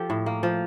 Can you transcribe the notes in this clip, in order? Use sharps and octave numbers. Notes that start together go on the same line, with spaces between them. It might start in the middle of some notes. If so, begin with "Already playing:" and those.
Already playing: F3 G4 A4
A2
A#3
F3